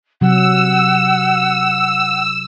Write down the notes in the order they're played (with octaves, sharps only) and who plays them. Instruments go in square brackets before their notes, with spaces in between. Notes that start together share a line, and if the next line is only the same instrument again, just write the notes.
[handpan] C3 F#3 [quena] F#5 [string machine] E6